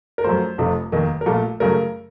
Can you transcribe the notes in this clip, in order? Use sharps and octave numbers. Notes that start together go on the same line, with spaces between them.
A#4
F#2 F3 A3 C5
F1 F2 C3 F3 A3
F1 D#2 D#3 A#3
A#4
A#1 A#2 A3 A4
F#2 C#3 A3 A#4